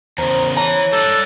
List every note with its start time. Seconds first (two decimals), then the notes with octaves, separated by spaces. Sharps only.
0.18 E2 C#3 A#4 C5
0.57 E3 C#5 A#5
0.93 G3 D4 A4